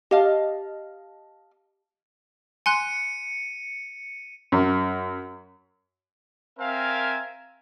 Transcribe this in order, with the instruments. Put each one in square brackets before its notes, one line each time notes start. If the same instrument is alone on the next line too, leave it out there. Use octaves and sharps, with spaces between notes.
[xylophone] G4 [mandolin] D#5 F5 A5
[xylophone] G#5 C6 F#6 [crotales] C#7 D#7
[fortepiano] F#2
[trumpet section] C4 A#4 E5 F5 G#5